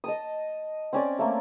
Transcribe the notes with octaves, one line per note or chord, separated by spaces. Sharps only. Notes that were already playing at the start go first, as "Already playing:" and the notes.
D#5 A5 D#6
C4 C#4 D5
A3 A#3